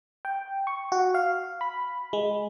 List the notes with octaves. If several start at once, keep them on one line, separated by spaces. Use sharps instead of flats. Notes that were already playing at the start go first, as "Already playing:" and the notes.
G5
C#6
F#4
F5
B5
G#3